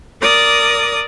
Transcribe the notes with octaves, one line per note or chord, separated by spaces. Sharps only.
A#4 D5 D6 D#6